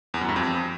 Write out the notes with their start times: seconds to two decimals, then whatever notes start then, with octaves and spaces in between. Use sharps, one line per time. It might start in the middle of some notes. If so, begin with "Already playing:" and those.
0.14 E2
0.21 F#2
0.29 G2
0.36 F2